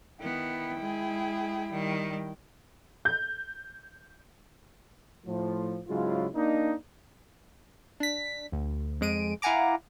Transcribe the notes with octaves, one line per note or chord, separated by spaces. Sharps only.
D#3 B3 E4 G5
G#3 G#4
D#3 G3
G6
A2 F3
G#2 C#3 F#3 G#3 E4 F4
A#3 D4 D#4
D4 B6
D2
F2 G#3 D7 D#7
E4 F5 F#5 G#5 A#5 D6